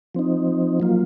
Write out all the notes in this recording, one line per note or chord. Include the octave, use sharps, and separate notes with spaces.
F3 C4 D#4
F#3 A#3 F4